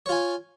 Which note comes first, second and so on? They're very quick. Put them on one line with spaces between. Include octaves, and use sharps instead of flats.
C#5 F4 G#5